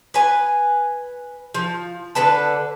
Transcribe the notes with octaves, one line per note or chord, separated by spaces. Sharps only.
B4 G#5
F3
D3 D4 B4 A5